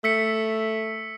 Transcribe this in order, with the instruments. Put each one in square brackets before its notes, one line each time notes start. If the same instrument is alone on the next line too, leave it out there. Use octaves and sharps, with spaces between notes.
[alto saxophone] A3 [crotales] E6 B6 C#7